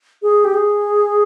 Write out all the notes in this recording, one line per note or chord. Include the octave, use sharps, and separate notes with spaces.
G#4
G4
G#4